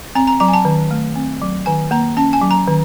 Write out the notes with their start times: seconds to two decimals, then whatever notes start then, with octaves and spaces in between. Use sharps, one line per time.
0.15 C4 A#5
0.27 A#5
0.40 F#3 A#5
0.48 G#5
0.54 A5
0.65 D#3
0.91 A3
1.16 C4
1.42 F#3
1.66 D#3 G#5
1.91 A#3 A#5
2.17 C#4 A5
2.33 G#5
2.41 F#3
2.51 A#5
2.67 D#3